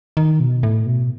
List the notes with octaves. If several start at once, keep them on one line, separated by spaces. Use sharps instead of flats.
D#3
B2
A2
B2